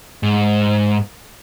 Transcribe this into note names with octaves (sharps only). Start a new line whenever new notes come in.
G#2